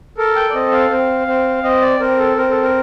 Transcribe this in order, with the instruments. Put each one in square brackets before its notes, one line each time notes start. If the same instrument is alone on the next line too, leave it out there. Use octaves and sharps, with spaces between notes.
[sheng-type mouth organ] A4 A#4
G5
D5
C4 D#5
F5
C4
C4
C4 D#5
D5
C4 A#4
A4
C4 A#4
A4
A#4